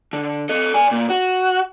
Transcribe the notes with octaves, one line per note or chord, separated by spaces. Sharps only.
D3
A4 D#5
D5 G#5
A#2
F#4